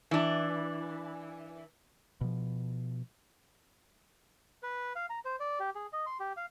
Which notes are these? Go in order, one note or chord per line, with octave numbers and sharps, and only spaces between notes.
E3 D4
B2 F3
B4
F5
A#5
C5
D5
G4
G#4
D#5
C6
G4
F5